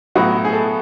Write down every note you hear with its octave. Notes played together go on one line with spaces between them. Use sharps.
A2 F#3 B3 F#4
G#4
A4